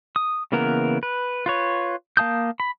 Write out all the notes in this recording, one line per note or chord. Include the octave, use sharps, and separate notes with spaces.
D#6
C#3 E3 A#3 B3 A#4
B4
F4 B4 C#5
A#3 F5 A5 D#6 G6
B5